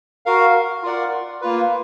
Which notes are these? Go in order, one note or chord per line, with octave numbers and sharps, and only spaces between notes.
F#4 A#4 F5
F4 A#4 D5 F#5
A#3 F4 B4